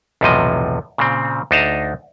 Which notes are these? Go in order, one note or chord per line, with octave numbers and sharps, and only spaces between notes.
B1 E2 A2 C3 F3 D#5
A#2 C#3 C4
D2 D4 D#4 D#5 A5 A#5